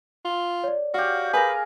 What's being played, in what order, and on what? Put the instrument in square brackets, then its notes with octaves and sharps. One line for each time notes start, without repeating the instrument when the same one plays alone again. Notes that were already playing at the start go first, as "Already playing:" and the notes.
[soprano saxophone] F4
[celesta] C#5 D5
[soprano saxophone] F#4 [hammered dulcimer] G4 F5
[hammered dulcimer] G#4 A#4 [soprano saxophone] B4 [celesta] G#5 A#6